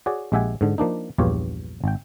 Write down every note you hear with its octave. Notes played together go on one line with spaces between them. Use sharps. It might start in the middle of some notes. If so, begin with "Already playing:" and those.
F#4 G#4 C#5 D5
A#1 G#3 G4 E5 F#5 G#5
G#2 D3
F3 A#3 D4 D#4
A#1 E2 G2 F4 G4 C#5
G#1 G5